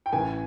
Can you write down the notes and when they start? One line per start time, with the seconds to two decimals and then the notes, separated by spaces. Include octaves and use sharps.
0.06 G5
0.12 A1 G#5